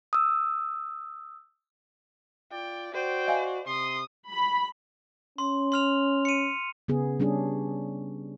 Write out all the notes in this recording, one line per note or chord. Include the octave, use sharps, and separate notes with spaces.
D#6 E6
F4 D5 G5
F#4 C5 D5 G5
D#5 F5 G#5
C3 C6 D#6
B5
C#4 C6
C6 F6 F7
C#7 D#7
C#3 B3 G#4
G3 C#4 D4 G#4